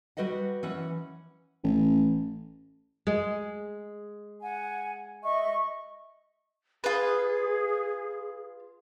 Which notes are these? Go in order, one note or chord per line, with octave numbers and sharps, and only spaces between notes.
G3 F#4 B4 D#5 F#5
E3 C#4 F#5
A1
G#3
F#5 G#5
D#5 E5 C#6
F4 G#4 B4